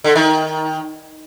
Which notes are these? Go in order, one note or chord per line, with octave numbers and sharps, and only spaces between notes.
D3
D#3